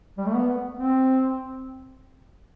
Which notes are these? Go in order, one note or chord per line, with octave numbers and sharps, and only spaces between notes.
G3
A3
B3
C4